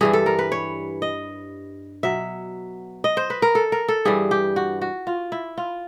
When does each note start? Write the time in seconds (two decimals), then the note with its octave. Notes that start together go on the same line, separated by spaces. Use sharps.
0.01 G2 E3 G3 G#4
0.13 A4
0.26 A#4
0.39 B4
0.52 C#5
1.02 D#5
2.03 B2 F#3 E5
3.04 D#5
3.17 C5
3.30 B4
3.42 A#4
3.55 A4
3.72 A#4
3.88 A4
4.05 G2 E3 G3 G#4
4.31 G4
4.56 F#4
4.82 F#4
5.07 F4
5.32 E4
5.58 F4